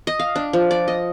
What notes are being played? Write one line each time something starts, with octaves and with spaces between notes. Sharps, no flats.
D#5
F5
D4
F3
D5
D#5